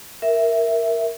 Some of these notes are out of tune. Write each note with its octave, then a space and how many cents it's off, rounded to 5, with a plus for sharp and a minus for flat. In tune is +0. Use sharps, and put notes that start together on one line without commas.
A#4 +0 E5 +0